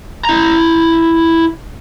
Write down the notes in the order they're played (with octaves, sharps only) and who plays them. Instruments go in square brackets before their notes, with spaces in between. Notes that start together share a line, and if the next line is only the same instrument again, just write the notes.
[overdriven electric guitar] E4 A#5